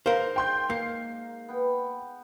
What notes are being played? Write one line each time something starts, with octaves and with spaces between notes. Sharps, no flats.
G#2 A#4 C5 D#5 F5
G5 C6 G6
A#3 F5 C7
B3 G5